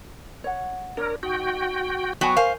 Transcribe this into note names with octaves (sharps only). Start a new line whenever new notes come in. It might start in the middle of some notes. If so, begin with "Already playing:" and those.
C#5 F#5
D4 A#4 C#5
D#4 F#4 G5
F#3 B3 F#4 G5 G#5
A#4 C5 F5 G#5